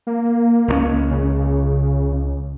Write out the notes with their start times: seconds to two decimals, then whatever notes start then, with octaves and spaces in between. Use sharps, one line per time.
0.07 A#3
0.68 C#2 G#3 C#4
1.11 C#3